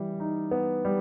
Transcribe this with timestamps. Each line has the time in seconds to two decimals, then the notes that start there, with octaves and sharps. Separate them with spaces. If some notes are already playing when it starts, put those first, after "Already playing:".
Already playing: E3 G3
0.20 D#4
0.51 B3
0.85 G3